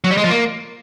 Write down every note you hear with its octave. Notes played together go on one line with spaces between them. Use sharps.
F#3
G3
G#3
F3
A#3